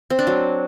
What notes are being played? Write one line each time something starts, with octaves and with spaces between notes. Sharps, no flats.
C4
D4
F#3